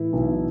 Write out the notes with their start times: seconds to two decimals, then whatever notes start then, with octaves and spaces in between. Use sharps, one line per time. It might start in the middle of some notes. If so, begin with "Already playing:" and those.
Already playing: A2 E3 E4
0.13 B1